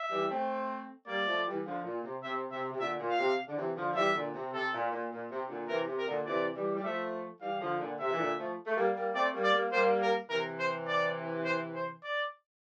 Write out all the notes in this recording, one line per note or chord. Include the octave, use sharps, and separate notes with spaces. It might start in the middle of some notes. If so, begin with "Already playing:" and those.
Already playing: E5
E3 G3
A3 C4
G3 A#3 D5
F3 A3
E3 G3
D3 F3
A#2
C3
C3 E5
C3 E5
C3
A#2 D3 E5
A#2
F5
C3
D3
C3 E3
D3 F3
F3
E3 G3 E5
A#2 D3
C3
C3 A4
A#2
A#2
A#2
C3
A#2 D3
C3 E3 A#4
C3
A#4
A#2 D3
C3 E3 D5
E3 G3
G3
F3 A3 E5
E3 G3 F5
D3 F3
A#2 D3
C3 E5
E3
A#2 D3
F3 A3
A3
G3 A#3
G3 A#3
A3 C4 D5
G3 A#3
D5
G3 A#3
G3 A#3 C5
A#4
C3 E3 A#4
C5
D5
C5
C5
D5